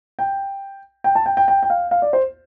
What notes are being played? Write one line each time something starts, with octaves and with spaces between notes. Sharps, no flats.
G5
G5
A5
G5
G5
G5
G5
F5
F5
D5
C5